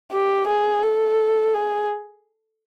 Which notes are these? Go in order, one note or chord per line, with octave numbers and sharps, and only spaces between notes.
G4
G#4
A4
G#4